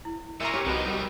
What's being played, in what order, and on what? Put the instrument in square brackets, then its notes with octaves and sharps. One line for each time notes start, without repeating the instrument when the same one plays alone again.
[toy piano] E4
[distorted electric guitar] A#2 [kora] A#4 D5 [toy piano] E5 C#6 [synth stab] A#5 C6 E6
[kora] G4 C#5
[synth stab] C2 F#4 D#5 [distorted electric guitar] F3 D#4 [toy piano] B4 B5
[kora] G3 [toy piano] A#4 F#5